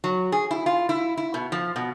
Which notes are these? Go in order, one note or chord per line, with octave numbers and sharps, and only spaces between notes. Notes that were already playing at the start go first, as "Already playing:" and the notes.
F#3
G#4
E4
F4
E4
E4
B2
F3
B2